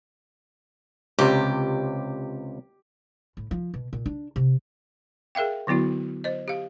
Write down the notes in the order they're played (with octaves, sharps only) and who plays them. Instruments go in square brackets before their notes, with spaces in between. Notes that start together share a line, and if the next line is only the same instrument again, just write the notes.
[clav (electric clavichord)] C#2 C3 [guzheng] G4
[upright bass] A2
F3
B2
A#2
D4
C3
[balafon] G#4 A#4 E5 F5 G5
D3 F#3 B3 E4 F#4
C5 D#5
G4 F5